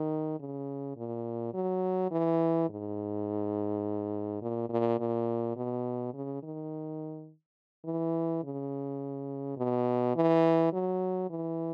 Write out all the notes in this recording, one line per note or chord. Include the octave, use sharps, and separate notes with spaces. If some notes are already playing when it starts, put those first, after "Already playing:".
Already playing: D#3
C#3
A#2
F#3
E3
G#2
A#2
A#2
A#2
B2
C#3
D#3
E3
C#3
B2
E3
F#3
E3